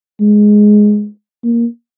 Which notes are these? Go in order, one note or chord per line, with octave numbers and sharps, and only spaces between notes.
G#3
A#3